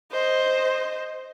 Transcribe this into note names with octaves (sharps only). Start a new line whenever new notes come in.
C5 D#5